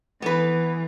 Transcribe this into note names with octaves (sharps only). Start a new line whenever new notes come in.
E3 B3 B4